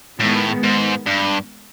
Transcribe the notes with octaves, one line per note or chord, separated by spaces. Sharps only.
A2 D#3 G#3 B3
G#2
G2